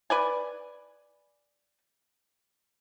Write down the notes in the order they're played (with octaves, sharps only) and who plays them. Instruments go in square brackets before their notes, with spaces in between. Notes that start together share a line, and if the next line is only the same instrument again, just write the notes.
[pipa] B4 D5 G#5